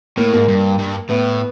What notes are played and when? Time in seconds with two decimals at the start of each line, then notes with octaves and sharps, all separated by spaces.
0.17 A2 A#3
0.33 G#2 A#3
0.48 G2
0.79 G2
1.10 A2 B3